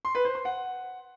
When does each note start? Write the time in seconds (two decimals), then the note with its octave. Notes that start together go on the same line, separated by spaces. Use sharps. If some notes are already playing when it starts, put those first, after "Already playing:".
0.05 C6
0.15 B4
0.25 C5
0.35 C6
0.45 F#5